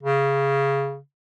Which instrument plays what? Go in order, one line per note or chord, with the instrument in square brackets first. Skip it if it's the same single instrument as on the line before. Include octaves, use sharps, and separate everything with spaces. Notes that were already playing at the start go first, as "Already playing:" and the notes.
[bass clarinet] C#3